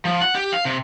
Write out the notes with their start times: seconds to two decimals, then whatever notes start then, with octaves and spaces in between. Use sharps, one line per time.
0.05 F3
0.21 F#5
0.35 G4
0.53 F5
0.65 C3